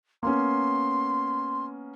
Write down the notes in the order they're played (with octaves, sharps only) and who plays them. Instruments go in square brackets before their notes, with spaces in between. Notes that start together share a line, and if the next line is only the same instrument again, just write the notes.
[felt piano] A#3 B3 C#4 [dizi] C6